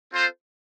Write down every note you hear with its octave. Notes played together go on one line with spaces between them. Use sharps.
C4 F4 A4 C5